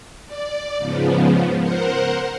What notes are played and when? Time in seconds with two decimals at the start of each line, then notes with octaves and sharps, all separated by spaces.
0.25 D5
0.77 G#2 C#3 F3 B3
1.59 A#4 C5 F#5